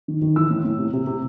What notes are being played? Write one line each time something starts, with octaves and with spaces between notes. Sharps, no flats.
D#3
D#3
E3 E6
A2
A2
C3
C3
C3